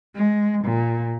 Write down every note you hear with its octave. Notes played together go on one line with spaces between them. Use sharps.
G#3
A#2